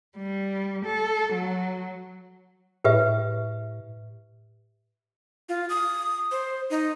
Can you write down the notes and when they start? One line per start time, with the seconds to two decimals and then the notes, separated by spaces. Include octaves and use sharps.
0.17 G3
0.85 A4
1.33 F#3
2.84 A2 G4 B4 E5
5.49 F4
5.69 D#6
6.31 C5
6.70 D#4